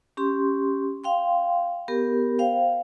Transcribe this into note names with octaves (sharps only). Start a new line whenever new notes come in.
C#4 G4 C6
F5 G5 C6
B3 G4 A#4
C5 F5 G5